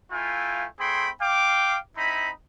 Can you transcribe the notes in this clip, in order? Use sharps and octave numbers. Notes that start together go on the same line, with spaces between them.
A3 E4 F4 F5 G5 G#5
A3 C4 G#4 G5 B5 C6
F5 G5 D6
C4 D#4 E4 D#5 B5